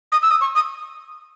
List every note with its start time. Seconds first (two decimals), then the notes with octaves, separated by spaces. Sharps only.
0.11 D#6
0.22 E6
0.30 D#6
0.41 C#6
0.55 D#6